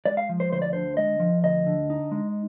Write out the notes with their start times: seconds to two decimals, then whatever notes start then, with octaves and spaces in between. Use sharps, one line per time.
0.05 G#3 D5
0.17 F5
0.29 F3
0.40 C5
0.52 D2 C5
0.62 D5
0.73 D3 C5
0.97 G#3 D#5
1.20 F3
1.44 D2 D#5
1.67 D3
1.90 D#4
2.12 G#3